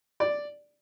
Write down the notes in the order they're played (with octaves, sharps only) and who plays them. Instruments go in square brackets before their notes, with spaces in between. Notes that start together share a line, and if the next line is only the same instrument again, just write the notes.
[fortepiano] D5